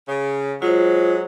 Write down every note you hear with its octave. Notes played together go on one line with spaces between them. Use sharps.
C#3
F#3 G#3 F4 C5